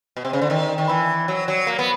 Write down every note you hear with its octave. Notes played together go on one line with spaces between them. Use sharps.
B2
C3
C#3
D3
D#3
D#3
E3
F#3
F#3
A#3
B3